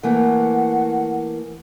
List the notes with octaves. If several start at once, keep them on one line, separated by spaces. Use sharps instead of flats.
E3 A3 A#3 F#5